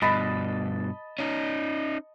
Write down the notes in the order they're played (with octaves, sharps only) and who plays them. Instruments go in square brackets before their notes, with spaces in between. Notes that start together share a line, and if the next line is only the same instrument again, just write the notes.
[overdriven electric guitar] G2 B2 [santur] D#5 A5 B5
[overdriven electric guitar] C#4 D#4